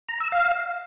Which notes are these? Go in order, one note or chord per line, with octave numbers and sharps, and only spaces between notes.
A#5
E6
F5